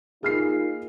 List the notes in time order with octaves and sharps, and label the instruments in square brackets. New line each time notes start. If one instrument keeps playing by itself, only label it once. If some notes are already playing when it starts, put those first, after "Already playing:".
[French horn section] A#3 D#4 F4 [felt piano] G#4 F6 C7